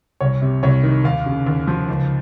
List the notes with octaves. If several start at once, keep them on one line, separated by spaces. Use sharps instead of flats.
C2 C#5
C3
C2 C#5
D#3
D#2 F5
C#3
D#2
F3
C#2